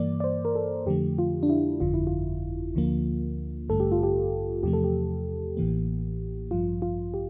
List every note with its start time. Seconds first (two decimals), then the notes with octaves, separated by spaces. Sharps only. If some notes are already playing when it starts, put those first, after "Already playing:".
Already playing: G2 E3 A#3 D5
0.20 D5
0.24 C5
0.45 A#4
0.55 A4
0.86 F2 D3 F3 A3 G4
1.19 F4
1.43 D4
1.50 E4
1.80 G1 F2 D3 F4
1.94 E4
2.07 F4
2.75 D2 D3 F3 A#3
3.68 A1 G2 D3 A3 A4
3.80 G4
3.92 F4
4.03 G4
4.63 E2 C3 F3 A3 G4
4.73 A4
4.84 G4
5.57 A1 A2 E3 A#3
6.51 A1 G2 F3 F4
6.82 F4
7.14 G4